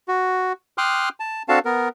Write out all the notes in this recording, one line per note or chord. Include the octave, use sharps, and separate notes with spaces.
F#4
G5 C6 D6 D#6 F6 F#6
A5
C4 D4 F#4 A4 F5 A5
B3 A#4